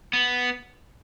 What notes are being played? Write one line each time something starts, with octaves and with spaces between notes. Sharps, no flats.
B3